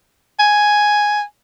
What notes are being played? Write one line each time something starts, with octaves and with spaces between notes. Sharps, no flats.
G#5